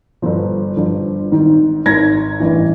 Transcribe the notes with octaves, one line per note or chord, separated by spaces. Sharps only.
G1 G2 D3 F3
G1 G2 D3 F3
G#1 G#2 D#3
G#1 G#2 D#3 G#6 A#6
A1 G2 E3